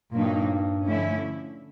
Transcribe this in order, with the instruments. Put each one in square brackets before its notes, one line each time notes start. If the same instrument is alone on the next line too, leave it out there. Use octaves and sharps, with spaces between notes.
[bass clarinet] G2 [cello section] A#2 F#3 A#3 D#4
[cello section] D3 F3 A3 C#4 E4